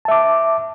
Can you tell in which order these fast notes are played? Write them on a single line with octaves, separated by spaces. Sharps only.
A5 E5 D6